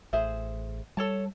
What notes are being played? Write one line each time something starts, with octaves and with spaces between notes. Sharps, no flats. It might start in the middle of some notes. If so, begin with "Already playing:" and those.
A1 G#4 C5 E5
G3 A4 C#5 A5